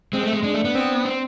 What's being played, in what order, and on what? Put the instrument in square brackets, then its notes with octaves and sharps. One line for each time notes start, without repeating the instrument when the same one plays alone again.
[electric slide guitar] G#3 [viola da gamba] C4
[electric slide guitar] A3
G#3
[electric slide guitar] G#3 [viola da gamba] D4
[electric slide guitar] A3
B3
[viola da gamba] C4
[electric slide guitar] C4